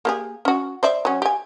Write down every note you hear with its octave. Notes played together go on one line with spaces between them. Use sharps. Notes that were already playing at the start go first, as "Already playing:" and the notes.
A#3 G4 G#4
C#4 F#4
C5 D5 E5
F#3 C#4
G4 G#5